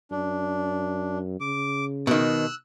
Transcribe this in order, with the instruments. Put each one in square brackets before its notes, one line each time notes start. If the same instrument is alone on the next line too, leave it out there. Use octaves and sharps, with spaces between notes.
[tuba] F#2 [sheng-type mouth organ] D4
[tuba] C#3 [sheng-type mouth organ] D6
[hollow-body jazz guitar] B2 D#3 [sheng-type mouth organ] E6 F#6